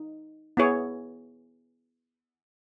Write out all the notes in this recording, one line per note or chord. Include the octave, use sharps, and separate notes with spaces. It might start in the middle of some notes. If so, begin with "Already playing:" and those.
Already playing: D#4
B3 E4 G#4 C#5